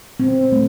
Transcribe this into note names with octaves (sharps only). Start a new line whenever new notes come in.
A#2 C4
A3